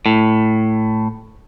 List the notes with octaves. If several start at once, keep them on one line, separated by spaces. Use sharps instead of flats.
A2